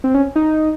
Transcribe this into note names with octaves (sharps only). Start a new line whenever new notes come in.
C4
C#4
D#4